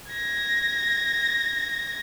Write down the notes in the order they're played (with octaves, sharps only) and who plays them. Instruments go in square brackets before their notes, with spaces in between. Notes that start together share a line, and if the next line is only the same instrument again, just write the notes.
[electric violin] G#6 A#6